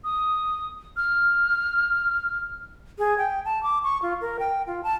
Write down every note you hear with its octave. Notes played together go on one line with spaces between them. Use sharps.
D#6
F6
G#4
G5
A5
D6
C#6
F4
A#4
G5
F4
A5